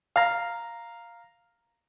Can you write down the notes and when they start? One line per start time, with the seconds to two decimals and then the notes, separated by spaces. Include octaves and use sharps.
0.16 F5 A#5